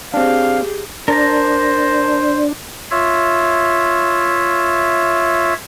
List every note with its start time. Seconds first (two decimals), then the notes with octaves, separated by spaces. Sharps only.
0.14 C4 D4 G4 G#4 F5
1.08 D4 A#4 C5 A5 A#5
2.91 F4 C#5 E5